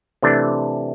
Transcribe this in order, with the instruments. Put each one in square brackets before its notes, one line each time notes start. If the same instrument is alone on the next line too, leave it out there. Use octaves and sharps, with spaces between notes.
[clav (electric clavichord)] C3 E3 A3 D4